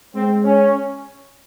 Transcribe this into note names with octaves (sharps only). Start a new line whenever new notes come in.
G#3 C4
C#4